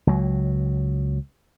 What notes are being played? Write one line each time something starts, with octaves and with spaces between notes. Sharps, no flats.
C#2 F#3